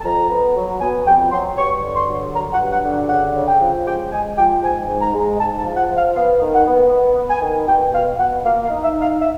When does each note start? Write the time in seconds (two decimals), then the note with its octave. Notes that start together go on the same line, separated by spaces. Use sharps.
0.01 A5
0.05 F2 A#5
0.30 B3
0.56 F#3
0.81 B3 G#5
1.06 F2 G5
1.32 F#3 C6
1.57 G2 C#6
1.82 D3
1.95 C6
2.08 F#3
2.34 F#3 A#5
2.53 F#5
2.59 G2
2.72 F#5
2.85 D3
2.91 F#5
3.09 C#3 F#5
3.36 C#3
3.48 G5
3.61 F3
3.86 G#3 G5
4.12 G#3 G#5
4.37 F3 G5
4.63 G#2 G#5
4.88 G#2
5.01 A#5
5.13 G#3
5.39 G#2 A5
5.58 A5
5.65 F3
5.76 F#5
5.90 F3
5.96 F5
6.15 B3 F5
6.41 D#3
6.54 F#5
6.66 B3
6.92 B3
7.17 B3
7.30 G#5
7.42 D#3
7.68 B2 G5
7.93 B2 F5
8.18 B2 F#5
8.45 A#3 F5
8.63 F5
8.70 D#4
8.83 E5
8.95 D#4
9.01 F5
9.20 E5